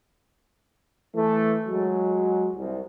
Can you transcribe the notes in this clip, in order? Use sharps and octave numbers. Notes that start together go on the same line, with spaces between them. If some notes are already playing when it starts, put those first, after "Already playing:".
E3 A3
F#3 G#3
C2